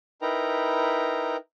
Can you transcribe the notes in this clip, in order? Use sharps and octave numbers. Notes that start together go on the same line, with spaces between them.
D#4 E4 A#4 B4 G5 A#5